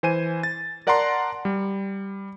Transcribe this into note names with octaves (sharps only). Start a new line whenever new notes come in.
E3 C5 G#5 D#7
A6
A#4 D5 F#5 A5 A#5 C6
G3